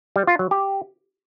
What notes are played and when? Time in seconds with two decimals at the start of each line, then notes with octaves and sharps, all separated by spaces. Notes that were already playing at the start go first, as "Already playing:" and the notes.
0.16 G3
0.27 F4
0.39 F#3
0.51 G4